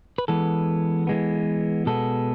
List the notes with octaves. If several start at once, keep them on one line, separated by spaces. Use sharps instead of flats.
B4
E3 G#3 B3 A4
E3 G#3 B3
B2 G#3 B3 A4